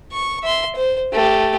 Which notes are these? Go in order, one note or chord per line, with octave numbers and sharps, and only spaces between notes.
C#6
E5 C6
C5
A3 G4